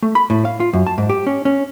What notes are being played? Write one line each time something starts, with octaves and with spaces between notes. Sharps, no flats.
A3
B5
A2
F5
F4
F#2
A5
G#2
G4
C#4
C#4